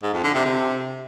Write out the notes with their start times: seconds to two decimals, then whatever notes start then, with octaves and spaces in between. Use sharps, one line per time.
0.02 G#2
0.13 F2
0.24 D3
0.34 C3
0.45 C3